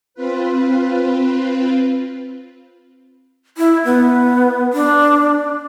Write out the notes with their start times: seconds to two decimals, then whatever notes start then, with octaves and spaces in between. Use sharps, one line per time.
0.14 C4 F4 B4
3.58 E4
3.85 B3
4.73 D4